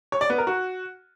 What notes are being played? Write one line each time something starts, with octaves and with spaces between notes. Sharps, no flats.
C#5
D5
B3
A#4
F#4